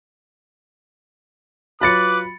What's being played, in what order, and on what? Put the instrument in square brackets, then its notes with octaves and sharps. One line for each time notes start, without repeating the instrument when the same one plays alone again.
[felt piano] F#3 F4 C#5 [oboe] B4 [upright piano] B5 A6 C#7 [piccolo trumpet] D6